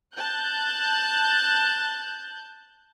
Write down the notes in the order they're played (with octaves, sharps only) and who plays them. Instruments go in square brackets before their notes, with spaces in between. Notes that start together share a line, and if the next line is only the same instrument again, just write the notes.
[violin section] A5 F#6 G6